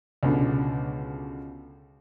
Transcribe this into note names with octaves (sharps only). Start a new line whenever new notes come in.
C#2 B2 D3